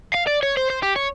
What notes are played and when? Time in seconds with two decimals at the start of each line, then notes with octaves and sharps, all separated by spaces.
0.15 F5
0.27 D5
0.43 C#5
0.57 C5
0.70 C5
0.83 G4
0.96 C#5